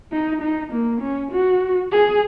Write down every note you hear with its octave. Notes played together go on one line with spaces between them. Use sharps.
D#4
D#4
A#3
C#4
F#4
G#4